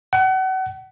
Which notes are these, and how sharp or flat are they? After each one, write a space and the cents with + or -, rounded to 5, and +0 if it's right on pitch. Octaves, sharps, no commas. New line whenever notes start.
F#5 +35